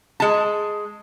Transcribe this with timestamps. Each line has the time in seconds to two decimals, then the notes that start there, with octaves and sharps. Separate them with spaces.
0.20 G#3 A5